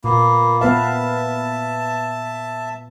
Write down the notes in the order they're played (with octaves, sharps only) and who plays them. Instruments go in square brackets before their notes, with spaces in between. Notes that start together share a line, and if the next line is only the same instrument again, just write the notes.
[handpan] A#2 [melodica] A#3 B3
[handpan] B3 B4 F5 [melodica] E5 A5